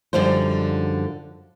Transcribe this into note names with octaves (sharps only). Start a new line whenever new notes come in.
F#2 D3 F3 G3 D#4 C5